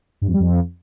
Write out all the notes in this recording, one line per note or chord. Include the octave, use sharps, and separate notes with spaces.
G2
F2
G3
F2